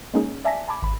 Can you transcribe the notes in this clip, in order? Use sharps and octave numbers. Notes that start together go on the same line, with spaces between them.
G#3 A#3 C#4 D#4 G#4
D5 E5 G#5 A5 A#6 B6
G#5 A5 B5 D6 G#6
G#1 B5